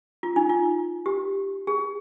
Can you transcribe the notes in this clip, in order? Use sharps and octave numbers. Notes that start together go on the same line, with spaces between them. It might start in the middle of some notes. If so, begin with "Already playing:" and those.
F4
D#4
F4
G4
G#4